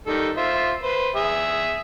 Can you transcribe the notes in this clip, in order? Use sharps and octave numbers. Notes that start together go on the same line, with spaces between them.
D#3 G3 A4
F4 C5 E5
B4 C5
G#4 E5